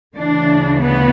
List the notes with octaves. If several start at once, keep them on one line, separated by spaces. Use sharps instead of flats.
D2 C#3 E3 D4
B3